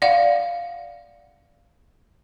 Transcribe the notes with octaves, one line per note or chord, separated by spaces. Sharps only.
D5 F5 F#5